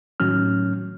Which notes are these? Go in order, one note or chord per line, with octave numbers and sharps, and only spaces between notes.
A2 D#3 F#3 C#4 F6